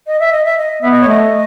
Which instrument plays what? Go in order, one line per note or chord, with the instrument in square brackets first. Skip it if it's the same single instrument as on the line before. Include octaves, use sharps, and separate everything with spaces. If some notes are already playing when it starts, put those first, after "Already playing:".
[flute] D#5
E5
D#5
E5
D#5
[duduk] B3 [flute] E5
[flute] D#5
C#5
[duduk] A3 [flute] D#5